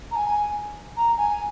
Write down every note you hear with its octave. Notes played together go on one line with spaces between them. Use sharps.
A#5
G#5
A#5
G#5